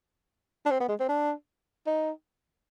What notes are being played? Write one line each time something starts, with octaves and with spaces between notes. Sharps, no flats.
D4
C4
B3
G#3
C4
D4
D#4